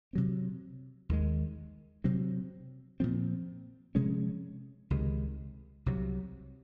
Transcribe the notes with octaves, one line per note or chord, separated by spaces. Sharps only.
C3 F#3 C4
D#2 D#3 G#3
C3 F#3 C4
A#2 F3 C4
C3 F3 G#3 C#4
C#2 C3 D#3 G#3
C2 C3 F#3